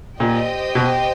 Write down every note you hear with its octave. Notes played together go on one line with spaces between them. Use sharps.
A#2 G4 C5 D#5 G5
B2